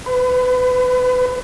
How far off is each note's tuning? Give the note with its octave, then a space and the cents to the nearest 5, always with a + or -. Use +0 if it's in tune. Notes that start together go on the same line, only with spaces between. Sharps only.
B4 +30